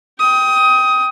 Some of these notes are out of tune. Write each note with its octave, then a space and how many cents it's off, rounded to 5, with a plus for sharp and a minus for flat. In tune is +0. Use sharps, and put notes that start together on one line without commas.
G5 +0 D#6 +20